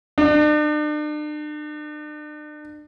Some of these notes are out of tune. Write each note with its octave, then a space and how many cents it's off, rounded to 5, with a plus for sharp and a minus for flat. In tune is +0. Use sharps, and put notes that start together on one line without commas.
D4 +40